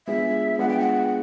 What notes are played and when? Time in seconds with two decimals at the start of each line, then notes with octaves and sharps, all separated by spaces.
0.07 G#3 B3 D4 F4 G#4 E5
0.59 G#3 B3 D4 F4 G#4 F#5
0.69 G5
0.80 F#5